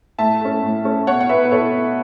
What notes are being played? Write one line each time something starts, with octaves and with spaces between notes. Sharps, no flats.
A2 E5 A5
A3 C#4
A2
A3 C#4
B2 C#5 F#5
F#5
B3 B4 E5
B4
B2 A4 C#5
B3